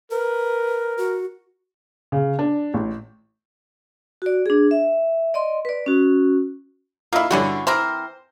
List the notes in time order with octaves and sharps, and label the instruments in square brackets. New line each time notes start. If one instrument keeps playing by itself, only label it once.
[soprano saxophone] A#4 [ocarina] B4
[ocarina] F#4
[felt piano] C#3
D4
A1
[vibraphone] F#4 D5
D4 G#4
E5
D5 D#5 C6
B4 D5
C#4 F#4
[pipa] A#3 E4 [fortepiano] F4 D#5 E5
[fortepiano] G2 D3 [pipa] C#4 E4 F#4
[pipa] E3 C4 A#4 [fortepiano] C5